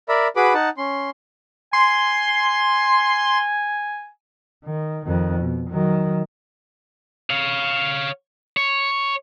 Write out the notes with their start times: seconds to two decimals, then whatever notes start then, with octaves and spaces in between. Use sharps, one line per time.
0.09 A#4 D5 E5 B5
0.36 F#4 G#4 B4 B5 D6
0.54 D#4 F#5 A5
0.78 C#4 C6
1.73 G#5 C6
4.65 D#3
5.06 F2 D#3
5.40 B2
5.70 D#3 F#3
7.30 C#5 F5
8.57 C#5